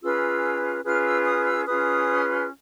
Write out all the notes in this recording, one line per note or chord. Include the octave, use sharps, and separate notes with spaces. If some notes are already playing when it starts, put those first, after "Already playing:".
C#4 F4 G#4 B4 E6
C#4 F4 G#4 B4 F6
E6
D#6
E6
C#4 F4 G#4 B4 D#6